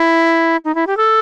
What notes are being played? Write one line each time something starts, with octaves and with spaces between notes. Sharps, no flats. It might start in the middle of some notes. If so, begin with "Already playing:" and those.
Already playing: E4
D#4
E4
G4
A4